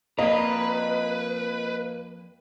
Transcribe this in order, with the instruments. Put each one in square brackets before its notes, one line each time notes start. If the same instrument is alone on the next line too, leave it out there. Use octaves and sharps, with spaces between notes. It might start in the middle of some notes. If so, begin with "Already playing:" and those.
[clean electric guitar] F2 D5 A#5 [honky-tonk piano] A#3 [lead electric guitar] B4 [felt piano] D#5